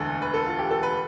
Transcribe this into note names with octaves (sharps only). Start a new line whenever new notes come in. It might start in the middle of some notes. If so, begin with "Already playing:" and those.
Already playing: E1 D2 D3 A4
B4
A4
F4
G4
A4
B4